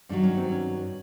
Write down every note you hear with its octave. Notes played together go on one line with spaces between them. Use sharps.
G2 D#3 F#3 D4
C#4
C4
C#4